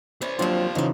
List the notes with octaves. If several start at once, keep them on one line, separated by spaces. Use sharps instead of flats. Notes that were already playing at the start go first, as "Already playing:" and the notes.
E3 C#4 C5 D5
D#2 F3 F#3 C4 D4 F4
C#3 E3 F#3 G#3 D#4